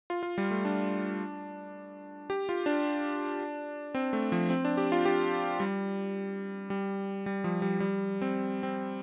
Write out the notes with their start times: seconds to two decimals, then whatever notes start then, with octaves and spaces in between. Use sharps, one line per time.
0.10 F4
0.23 F4
0.38 G3
0.51 A3
0.65 D4
2.30 G4
2.49 F4
2.66 D4
3.95 C4
4.13 A3
4.32 F3
4.50 C4
4.65 D4
4.77 G4
4.92 F4
5.05 G4
5.60 G3
6.70 G3
7.26 G3
7.44 F3
7.62 G3
7.80 G3
8.22 C4
8.63 C4